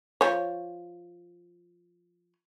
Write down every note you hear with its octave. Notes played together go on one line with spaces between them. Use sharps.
F3 C#5